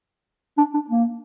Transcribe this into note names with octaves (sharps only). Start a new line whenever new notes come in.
D4
D4
A#3